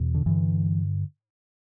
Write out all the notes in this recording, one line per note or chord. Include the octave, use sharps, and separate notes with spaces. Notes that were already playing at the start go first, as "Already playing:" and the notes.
Already playing: E2 B2
D3
G2 D3 E3